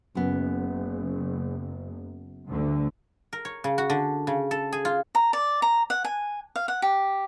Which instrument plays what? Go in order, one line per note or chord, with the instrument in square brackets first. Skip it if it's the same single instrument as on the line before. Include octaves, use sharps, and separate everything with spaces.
[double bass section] F#1 [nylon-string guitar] F#2 B3
[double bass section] D2 G2 D3
[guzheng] A#4
C#5
C#3
F#4
D3
C#3
A4
G#4
F4
[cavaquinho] A#5
D5
A#5
F#5
G#5
F5
F#5
G4